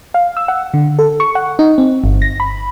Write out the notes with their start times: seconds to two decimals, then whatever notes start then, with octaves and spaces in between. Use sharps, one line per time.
0.14 F5
0.37 E6
0.48 F#5
0.74 D3
0.99 A4
1.20 C#6
1.35 F#5
1.59 D#4
1.78 C4
2.04 G1
2.22 A#6
2.40 B5